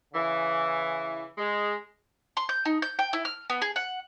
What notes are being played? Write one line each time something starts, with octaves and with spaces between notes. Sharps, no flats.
C#3 E3
G#3
C6
G6
D#4
G6
G5
E4
F6
B3
G#4
F#5